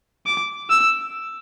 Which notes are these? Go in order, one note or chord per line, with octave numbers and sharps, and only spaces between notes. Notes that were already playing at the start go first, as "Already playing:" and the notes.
D6
E6